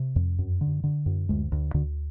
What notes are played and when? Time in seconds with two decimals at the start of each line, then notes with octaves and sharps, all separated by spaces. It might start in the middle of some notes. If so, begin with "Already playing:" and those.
Already playing: C3
0.16 F2
0.39 F#2
0.61 D3
0.84 D3
1.06 F#2
1.29 D2 G#3
1.52 D2
1.74 D2 D3